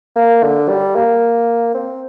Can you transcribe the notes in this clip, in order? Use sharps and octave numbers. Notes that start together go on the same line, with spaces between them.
A#3
D3
G3
A#3
C4